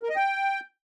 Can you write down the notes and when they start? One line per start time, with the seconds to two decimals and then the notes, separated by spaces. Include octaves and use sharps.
0.03 A#4
0.09 D#5
0.16 G5